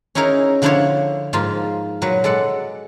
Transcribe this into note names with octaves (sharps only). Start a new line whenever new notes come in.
C#4 D#4 E4 G#4 A#4
D3 F3 D4 E4 C5 C#5
G#2 F3 A#3 F4
A#2 F#3 B4
G#3 A4 D5 F#5